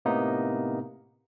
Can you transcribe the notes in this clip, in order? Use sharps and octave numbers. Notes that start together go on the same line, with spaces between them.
A2 C3 A#3 B3 D#4